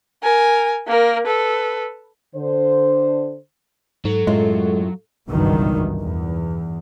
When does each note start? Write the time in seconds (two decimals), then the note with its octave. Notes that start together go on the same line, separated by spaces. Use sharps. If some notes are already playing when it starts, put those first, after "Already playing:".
0.23 A#4 G#5
0.88 A#3 A#4
1.26 A4 B4
2.36 D3 C5
4.05 G#2 F#3 A4
4.27 F#2 A2 G#3 F4
5.31 G#1 C#2 G2 B2 D#3 E3
6.01 E2